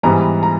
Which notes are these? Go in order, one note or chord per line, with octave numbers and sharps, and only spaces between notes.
G#2 E3 G3 B3 A#5
A#5